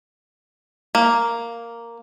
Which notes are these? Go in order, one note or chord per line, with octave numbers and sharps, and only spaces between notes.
A#3